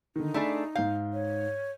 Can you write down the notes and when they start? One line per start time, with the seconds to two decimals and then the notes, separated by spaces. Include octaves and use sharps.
0.16 D3 D#3 D#4
0.34 A3 D4 G#4 B5
0.75 G#2 F5 G6
1.13 C#5